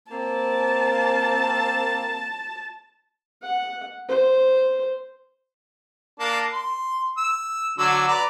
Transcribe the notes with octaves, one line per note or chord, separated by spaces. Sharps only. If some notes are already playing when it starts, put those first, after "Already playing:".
A#3 C4 A5
F#5
C5
A#3 D4 A5
C6
E6
D3 F#3 E6
B4 D5 A#5